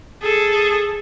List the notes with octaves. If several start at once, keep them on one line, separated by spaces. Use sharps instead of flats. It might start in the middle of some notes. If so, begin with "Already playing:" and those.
G#4 A4